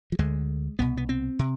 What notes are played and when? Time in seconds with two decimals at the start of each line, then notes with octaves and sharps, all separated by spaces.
0.12 F3
0.19 D2 D3 G#3
0.79 C2 B2 B3
0.97 B3
1.09 C4
1.39 C3